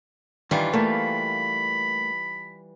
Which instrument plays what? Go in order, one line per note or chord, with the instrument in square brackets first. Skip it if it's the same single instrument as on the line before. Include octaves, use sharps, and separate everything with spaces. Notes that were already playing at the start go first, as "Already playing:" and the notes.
[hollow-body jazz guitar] G2 D#3 [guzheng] E3 G3 F4
[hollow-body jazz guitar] A3 A#3 [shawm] B5